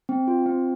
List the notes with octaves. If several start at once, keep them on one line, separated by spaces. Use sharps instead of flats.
C4
F4
C4